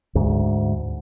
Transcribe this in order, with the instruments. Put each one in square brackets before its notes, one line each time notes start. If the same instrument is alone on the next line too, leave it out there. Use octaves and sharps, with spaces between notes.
[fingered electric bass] D2 G#2